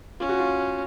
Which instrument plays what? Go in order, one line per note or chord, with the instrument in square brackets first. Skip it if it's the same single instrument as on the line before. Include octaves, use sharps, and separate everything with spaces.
[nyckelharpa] C#4 [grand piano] F4
[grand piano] F#4
F4